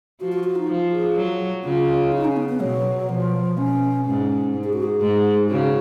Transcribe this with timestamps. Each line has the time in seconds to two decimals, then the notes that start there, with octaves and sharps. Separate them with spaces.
0.20 F3 F#4
0.32 F#4
0.44 F#4
0.56 D#4
0.69 F3
0.92 G#4
1.16 F#3
1.64 C#3 F4
2.12 D#4
2.25 C#4
2.37 B3
2.49 B3
2.60 B2 F#3
3.08 B2 F3
3.57 B2 C#4
4.05 G#2 C#4
4.53 G#2
4.64 G#4
4.73 F#4
4.83 G#4
5.01 G#2
5.50 C#3 F#4